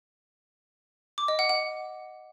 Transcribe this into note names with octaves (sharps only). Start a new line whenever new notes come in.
D6
D#5
F#5
F#5